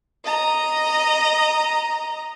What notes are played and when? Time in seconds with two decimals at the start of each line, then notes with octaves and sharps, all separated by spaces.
0.25 D#5 A#5